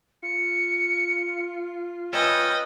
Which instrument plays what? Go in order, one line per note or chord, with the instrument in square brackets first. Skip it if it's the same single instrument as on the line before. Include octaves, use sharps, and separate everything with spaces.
[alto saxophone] F4 [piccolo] C#7
[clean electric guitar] C#4 A4 [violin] B4 D#5 [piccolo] G5